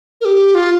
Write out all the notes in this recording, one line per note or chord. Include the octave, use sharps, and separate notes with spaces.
A#4
G4
F4